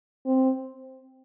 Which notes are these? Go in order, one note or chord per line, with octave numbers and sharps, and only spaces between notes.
C4